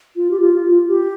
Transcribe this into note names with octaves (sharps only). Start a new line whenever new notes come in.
F4
G4
F4
F4
G4